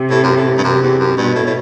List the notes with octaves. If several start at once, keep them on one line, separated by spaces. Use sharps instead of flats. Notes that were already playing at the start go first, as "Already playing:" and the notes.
Already playing: C3
A2
F#2
A2
G2
F#2 C3
E2
F#2
G2 B2
A2
A2